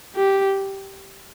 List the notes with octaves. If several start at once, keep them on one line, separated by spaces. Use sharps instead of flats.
G4